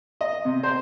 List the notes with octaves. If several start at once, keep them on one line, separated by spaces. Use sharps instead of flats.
D#5
C3
C5